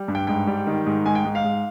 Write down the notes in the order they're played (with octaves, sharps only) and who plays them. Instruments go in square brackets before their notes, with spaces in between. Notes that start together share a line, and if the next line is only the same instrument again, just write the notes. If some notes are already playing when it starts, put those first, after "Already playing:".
Already playing: [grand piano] G3
G2
G5
G#2 G5
G3
D#3
G#2
G#2 G#5
G5
G#2
F5
G#2